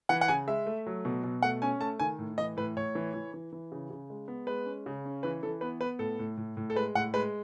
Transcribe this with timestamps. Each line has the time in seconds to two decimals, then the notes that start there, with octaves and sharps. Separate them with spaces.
0.09 E3 F#5
0.21 F#5
0.28 C#3 G#5
0.47 G#3 E5
0.66 A3
0.86 F#3
1.05 B2
1.24 B2
1.42 A3 F#5
1.62 C#4 G#5
1.81 A3 A5
2.00 D#3 G#5
2.19 A2
2.38 E3 D#5
2.57 A2 B4
2.76 A2 C#5
2.95 E3
3.14 E3
3.34 E3
3.53 E3
3.72 C#3
3.90 C#3
4.10 G#3
4.28 B3
4.47 G#3 B4
4.66 C#4
4.86 C#3
5.05 C#4
5.23 E3 B4
5.43 E3 A4
5.61 B3 B4
5.80 B3 B4
5.99 A2 A4
6.19 A2
6.37 A2
6.57 A2
6.70 A4
6.75 G#3 B4
6.95 A2 F#5
7.14 G#3 B4